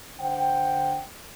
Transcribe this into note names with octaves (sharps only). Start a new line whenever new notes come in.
D3 C5 F#5 G5